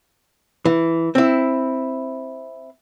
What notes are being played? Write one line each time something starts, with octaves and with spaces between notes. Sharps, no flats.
E3
C4 E4